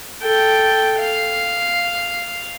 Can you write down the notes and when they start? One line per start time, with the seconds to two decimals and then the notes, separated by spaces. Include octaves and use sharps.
0.22 A4 G5
0.99 F5